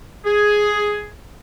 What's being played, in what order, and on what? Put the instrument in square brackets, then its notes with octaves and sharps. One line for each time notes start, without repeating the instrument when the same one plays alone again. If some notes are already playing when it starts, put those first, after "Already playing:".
[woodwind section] G#4